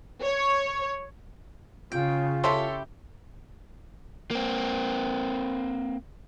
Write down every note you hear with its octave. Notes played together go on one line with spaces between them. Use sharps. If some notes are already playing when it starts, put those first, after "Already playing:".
C#5
C#3 F4 G5
E4 G4 A4 C#5 B5 C6
A#3 C4